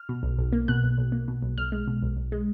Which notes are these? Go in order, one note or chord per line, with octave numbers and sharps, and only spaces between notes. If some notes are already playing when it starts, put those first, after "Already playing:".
Already playing: F6
B2
B1
B1
A#3
B2 F#6
B1
B1
A#3
B2
B1
B1 F6
G#3
B2
B1
B1
G#3